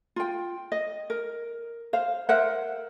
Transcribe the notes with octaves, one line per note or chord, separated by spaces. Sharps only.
F4 G5
D#5
A#4
C5 F5
A#4 C5 E5 F#5